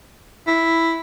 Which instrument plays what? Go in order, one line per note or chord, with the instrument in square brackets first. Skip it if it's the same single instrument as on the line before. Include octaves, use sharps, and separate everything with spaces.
[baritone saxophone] E4